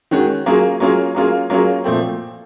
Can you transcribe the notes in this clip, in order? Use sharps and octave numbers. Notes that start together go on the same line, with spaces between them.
D#3 G#3 C#4 F#4
F#3 A#3 C#4 F4 G#4
F#3 A#3 C#4 F4 G#4
F#3 A#3 C#4 F4 G#4
F#3 A#3 C#4 F4 G#4
A#2 F3 A3 C4